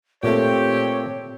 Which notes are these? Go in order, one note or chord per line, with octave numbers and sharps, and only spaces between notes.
A#2 A3 C4 G4 C#5